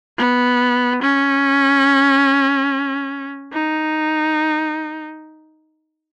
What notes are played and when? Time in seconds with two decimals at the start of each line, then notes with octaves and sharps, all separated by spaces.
0.18 B3
1.02 C#4
3.53 D#4